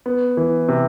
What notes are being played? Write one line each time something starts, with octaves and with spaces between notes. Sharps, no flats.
B3
E3
C3